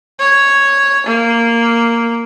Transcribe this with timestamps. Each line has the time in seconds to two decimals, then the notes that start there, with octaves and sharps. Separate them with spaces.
0.19 C#5
1.06 A#3